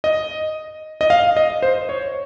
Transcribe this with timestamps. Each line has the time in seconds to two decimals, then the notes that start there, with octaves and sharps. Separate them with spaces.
0.04 D#5
1.01 D#5
1.10 F5
1.37 D#5
1.63 C5
1.89 C#5